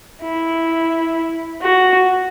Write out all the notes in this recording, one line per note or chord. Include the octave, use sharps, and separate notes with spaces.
E4
F#4